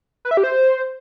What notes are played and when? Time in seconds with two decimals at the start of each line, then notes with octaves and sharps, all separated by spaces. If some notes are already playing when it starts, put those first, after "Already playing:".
0.25 B4
0.31 E5
0.37 G4
0.44 C5